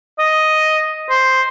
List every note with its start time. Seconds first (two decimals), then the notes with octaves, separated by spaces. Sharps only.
0.19 D#5
1.10 C5